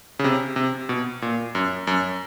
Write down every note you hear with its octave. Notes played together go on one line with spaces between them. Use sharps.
C#3
C3
C3
B2
A#2
F#2
F#2